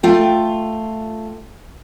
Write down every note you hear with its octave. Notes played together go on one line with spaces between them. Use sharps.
A3 F4 G5